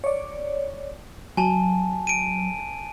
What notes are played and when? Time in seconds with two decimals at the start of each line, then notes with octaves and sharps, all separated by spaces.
0.04 C#5 D5
1.37 F#3 G#5 A5
2.07 D7 D#7